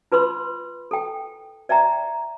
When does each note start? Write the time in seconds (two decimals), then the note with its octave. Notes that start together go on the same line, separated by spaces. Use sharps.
0.12 F4 B4 B5 C6 E6
0.91 A4 G5
1.69 D5 E5 G5 A#5